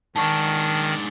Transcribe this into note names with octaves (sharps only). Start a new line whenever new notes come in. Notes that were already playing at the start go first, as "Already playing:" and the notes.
G#2 D#3 D4 A5 C#6